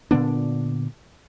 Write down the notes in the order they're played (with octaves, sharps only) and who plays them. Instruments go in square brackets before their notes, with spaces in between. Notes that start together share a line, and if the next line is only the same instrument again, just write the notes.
[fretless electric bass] A#2 D3 B3 D4